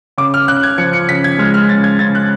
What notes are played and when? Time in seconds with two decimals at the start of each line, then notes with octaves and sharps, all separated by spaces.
0.18 C#3 D6
0.34 F6
0.48 C#3 F#6
0.63 G#6
0.78 F3 C#7
0.93 C#7
1.08 C#3 B6
1.24 G#6
1.39 G#3 F6
1.54 F6
1.69 C#3 A6
1.84 G#6
1.99 C#3 A6
2.15 F#6